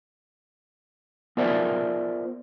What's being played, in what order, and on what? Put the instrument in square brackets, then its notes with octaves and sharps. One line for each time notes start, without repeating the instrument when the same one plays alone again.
[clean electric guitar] B3 F4 A#4 C5 D5 E5